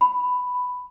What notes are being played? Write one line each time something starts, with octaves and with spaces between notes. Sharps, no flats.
B5